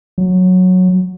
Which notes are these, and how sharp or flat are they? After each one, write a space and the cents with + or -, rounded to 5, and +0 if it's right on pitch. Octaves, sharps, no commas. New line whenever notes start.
F#3 -10